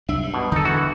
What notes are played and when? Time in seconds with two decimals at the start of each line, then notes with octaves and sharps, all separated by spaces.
0.09 C2 F#3 D4 E5
0.22 G2
0.34 B2
0.52 E1 D3 D#4 A4
0.65 E3 F#4